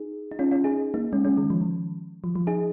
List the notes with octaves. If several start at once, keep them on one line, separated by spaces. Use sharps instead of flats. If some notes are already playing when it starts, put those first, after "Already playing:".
Already playing: D#4 G#4
D#4
C#4 F4
C#4 F4
D#4 G#4
A#3 D#4
G#3 C#4
G#3 C#4
D#3 G#3
F3
D#3
F3
F3
D#4 G#4